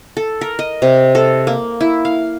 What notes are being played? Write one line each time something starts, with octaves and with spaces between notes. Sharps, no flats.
A4
A#4
D#5
C3
A4
A#3
E4
F5